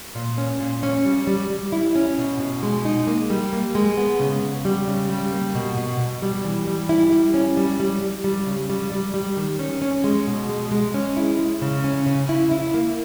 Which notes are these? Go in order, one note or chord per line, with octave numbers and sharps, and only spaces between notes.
A#2
C#4
A#2
C#4
G3
G3
G3
E4
C#4
B2
B2
G#3
D#4
A#3
G3
A#3
G#3
B3
C#3
C#3
G3
C#3
G3
A#3
B2
B2
B2
G3
E3
G3
E4
G3
C#4
G3
G3
G3
G3
C#3
G3
G3
G3
D#3
C#4
C#4
G#3
B2
G#3
G#3
C#4
E4
G#3
C#3
C#4
C#3
E4
E4
A#3